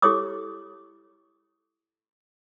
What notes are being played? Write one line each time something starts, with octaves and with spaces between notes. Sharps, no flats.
E4 G4 A4 C#5 D6 D#6